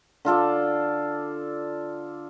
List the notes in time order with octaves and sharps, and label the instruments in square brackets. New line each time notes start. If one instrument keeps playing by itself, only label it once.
[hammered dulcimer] D3 F4 A4 D5